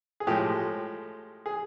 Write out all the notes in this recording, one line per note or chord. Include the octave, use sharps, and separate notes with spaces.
G#4
A2 F3 G#3 G4
G#4